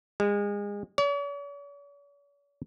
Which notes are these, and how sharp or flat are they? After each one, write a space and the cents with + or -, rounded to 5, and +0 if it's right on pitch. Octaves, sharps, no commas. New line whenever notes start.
G#3 -30
C#5 +45